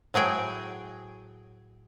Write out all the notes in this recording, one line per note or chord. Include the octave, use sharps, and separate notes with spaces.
A2 F#3 G#4 G5